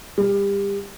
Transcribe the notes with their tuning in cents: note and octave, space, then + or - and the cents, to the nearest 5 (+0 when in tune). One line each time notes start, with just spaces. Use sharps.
G3 +30